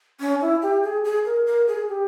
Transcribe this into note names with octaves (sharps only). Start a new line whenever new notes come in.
C#4
E4
G4
G#4
G#4
A#4
A#4
G#4
G4